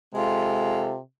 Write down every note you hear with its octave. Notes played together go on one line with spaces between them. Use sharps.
C3 G#3 F4 A4